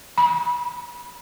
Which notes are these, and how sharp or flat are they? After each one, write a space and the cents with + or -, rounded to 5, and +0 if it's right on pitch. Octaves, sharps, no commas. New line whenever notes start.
B5 -20